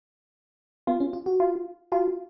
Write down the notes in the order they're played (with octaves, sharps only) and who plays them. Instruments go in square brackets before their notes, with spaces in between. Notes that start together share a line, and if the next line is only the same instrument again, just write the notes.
[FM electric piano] B3 [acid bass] F4
[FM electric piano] C#4
F4
F#4
[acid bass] F4
[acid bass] F4 [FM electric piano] F#4